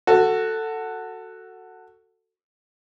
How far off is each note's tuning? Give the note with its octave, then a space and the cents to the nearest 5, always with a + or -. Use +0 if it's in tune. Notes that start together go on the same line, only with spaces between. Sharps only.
F#4 +0 A4 +15